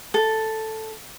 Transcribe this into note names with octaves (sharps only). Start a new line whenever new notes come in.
A4